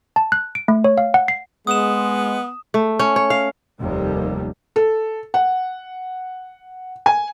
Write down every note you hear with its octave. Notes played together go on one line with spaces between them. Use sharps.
A5
F#6
D7
A3
C#5
F5
F#5
C7
G#3 B3 D#6 E7
A3
C#4
C#5
F5
F1 D#2 C3 G3
A4
F#5
G#5